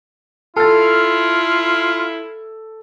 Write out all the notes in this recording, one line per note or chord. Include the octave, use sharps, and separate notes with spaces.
E4 F4 A4 F6 A6